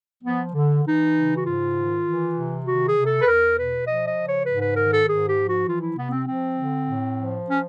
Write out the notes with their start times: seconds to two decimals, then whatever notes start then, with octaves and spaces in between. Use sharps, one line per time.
0.23 F3 B3
0.54 D3
0.84 E3 D#4
1.14 C#3
1.36 F#4
1.44 G#2 F4
1.75 D#3
2.05 E3
2.34 C3
2.64 D#3 F#4
2.85 G#4
2.95 C3
3.05 A4
3.21 B4
3.25 E2 A#4
3.55 B2 B4
3.85 F3 D#5
4.06 D#5
4.16 C#3
4.25 C#5
4.45 G#2 B4
4.61 B4
4.76 D#3 A#4
4.91 A4
5.06 G#2 G#4
5.26 G4
5.36 F3
5.46 F#4
5.66 E3 F4
5.81 E4
5.96 C3 B3
6.11 C4
6.26 F3 C4
6.57 D3
6.86 A2
7.17 F3
7.47 C#4